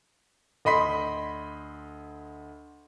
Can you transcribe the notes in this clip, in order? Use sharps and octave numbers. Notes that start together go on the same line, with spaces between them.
D2 D#5 B5 C6 B6